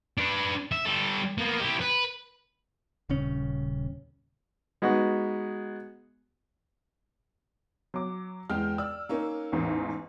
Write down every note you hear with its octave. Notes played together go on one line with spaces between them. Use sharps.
D4 B4
E5
G3 A4
A#3 B3
E4 G4
B4
D#1 C#3 C#4
G#3 B3 D#4 F#4
F#3 D6
E2 G#3 G5 F6
D5 E6
A#3 C#4 D#4
A1 E2 G#2